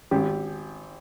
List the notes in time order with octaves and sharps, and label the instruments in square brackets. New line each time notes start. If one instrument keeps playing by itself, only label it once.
[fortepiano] G#1 G4